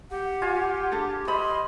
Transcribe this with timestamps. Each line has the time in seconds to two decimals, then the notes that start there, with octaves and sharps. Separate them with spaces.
0.11 G4 F#5
0.42 F4 G#5
0.92 D4 G#4 A4
1.27 C5 D#5 B5 C6